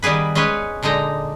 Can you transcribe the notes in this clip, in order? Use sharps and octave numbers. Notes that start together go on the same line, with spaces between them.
D#3 G3 B3 G#4 B4
G#3 C#4 G#4 B4 C#5
A#2 D3 G#3 D#4 A#5